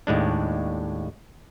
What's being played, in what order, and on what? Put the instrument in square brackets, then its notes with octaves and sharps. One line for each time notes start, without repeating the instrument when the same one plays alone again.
[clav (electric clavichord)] D#2 A2 G#3 D4